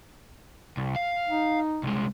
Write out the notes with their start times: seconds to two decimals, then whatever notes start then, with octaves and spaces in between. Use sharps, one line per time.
0.77 C2
0.96 F5
1.28 D#4
1.83 C2 G#3